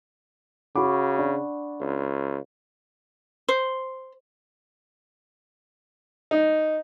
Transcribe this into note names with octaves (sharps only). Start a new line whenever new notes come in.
C#3 F#4 F#5 B5 C#6 D6
D4
C#2
C5
D#4